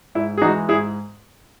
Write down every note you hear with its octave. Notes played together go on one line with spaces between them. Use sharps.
G#2 E4
G#4
E3 G#3 D#4 F#4
G#2 E4 G#4